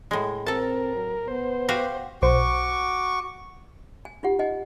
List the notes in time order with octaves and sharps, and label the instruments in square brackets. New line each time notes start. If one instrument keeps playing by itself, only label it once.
[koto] A2 G#3
[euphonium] C4 [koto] A4 A5 [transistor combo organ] A#4
[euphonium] F#3
[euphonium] B3 [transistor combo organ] C5
[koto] F#4 G4 F5
[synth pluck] B1 C5 [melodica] F#4 C#6 D6
[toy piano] G#5
D#4 F4 G4 F#5
D#4 D#5 F#5 G#5